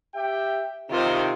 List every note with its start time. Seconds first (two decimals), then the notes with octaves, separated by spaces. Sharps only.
0.15 G4 E5 G5
0.90 C3 D#3 F4 C5